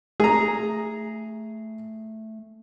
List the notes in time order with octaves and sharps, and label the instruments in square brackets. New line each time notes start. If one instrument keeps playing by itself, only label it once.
[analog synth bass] A3 [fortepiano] G#4 A#5